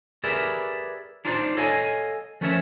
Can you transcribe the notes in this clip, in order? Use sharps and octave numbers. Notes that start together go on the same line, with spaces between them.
G4 G#4 A#4 B4 D5 E5
D4 D#4 F4 A4 C5 D5
A4 C#5 D#5 F5 G#5
F3 A3 C#4 A#4 C#5 E5